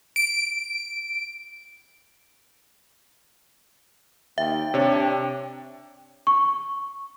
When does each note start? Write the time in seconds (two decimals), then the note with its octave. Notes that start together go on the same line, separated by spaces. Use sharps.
0.16 D7
4.38 D#2 E5 G5
4.74 C3 D4 C#5
6.27 C#6